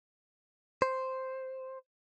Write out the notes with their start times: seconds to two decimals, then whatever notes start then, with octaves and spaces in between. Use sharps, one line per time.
0.82 C5